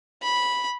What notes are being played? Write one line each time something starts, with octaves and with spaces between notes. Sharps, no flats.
B5